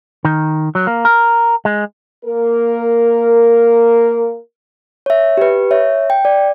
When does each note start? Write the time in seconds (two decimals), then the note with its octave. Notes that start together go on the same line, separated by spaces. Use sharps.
0.25 D#3
0.75 F#3
0.87 A#3
1.05 A#4
1.65 G#3
2.25 A#3 A#4
5.06 C#5 E5
5.37 G4 B4
5.71 C#5 E5
6.10 G5
6.25 D5